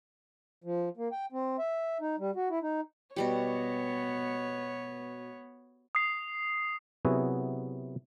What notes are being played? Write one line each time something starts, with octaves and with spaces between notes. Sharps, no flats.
F3
A#3
G5
C4
E5
D#4
G3
F#4
E4
D#4
B2 G3 B3 G4 C#5
D#6 C7
C3 F#3 B3 E4 F#4 G#4